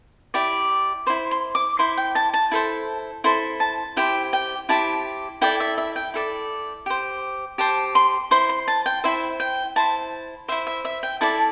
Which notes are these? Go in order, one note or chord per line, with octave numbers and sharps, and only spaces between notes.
E4 G4 D5
E4 C5 C6
C6
D6
E4 C5 C6
G5
A5
A5
E4 A4 C5
E4 A4 C5 C6
A5
E4 G4 C5 G5
G5
E4 G4 C5 A5
E4 A4 D5 G5
E5
E5
G5
E4 A4 D5
G4 C5
G4 C5 A5
C6
E4 C5 C6
C6
A5
G5
E4 C5 E5
G5
E4 C5 A5
E4 C5 E5
E5
E5
G5
E4 A4 D5 A5